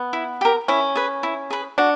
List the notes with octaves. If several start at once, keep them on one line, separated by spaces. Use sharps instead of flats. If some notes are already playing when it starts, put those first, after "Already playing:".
Already playing: B3
E4
G4 A#4
C#4 E4
G#4 B4
E4
G#4 B4
D4 F#4